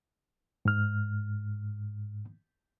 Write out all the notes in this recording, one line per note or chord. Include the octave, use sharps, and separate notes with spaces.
G#2 F6